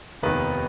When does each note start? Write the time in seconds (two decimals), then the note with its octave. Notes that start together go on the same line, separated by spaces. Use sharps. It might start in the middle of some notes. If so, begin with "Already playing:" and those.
0.23 F1 D#2 D#3 B3 B4